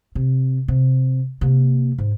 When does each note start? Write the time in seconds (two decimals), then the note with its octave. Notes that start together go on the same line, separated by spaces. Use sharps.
0.15 C3
0.68 C3
1.41 C3 A#3
1.98 G#2